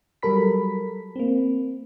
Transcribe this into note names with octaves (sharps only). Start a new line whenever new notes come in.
F#3 G3 A4 A#4 B5 B6
A#3 C4